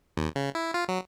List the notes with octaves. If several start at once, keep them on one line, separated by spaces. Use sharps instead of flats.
D#2
C#3
E4
F4
F#3